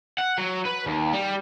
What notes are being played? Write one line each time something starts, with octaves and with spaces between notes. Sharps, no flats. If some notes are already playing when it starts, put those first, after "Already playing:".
F#5
F#3
B4
D#2
G3